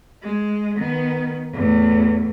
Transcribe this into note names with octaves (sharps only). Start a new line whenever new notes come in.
G#3
D#3 B3
E2 A2